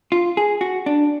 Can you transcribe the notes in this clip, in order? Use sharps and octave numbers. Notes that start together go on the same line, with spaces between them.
F4
G#4
F#4
D4